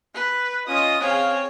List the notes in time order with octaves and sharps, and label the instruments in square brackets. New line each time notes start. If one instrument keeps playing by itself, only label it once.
[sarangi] B4
[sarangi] C#4 [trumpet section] F4 D#5 [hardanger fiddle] D#6
[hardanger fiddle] C4 G#4 [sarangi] C#5 [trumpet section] F5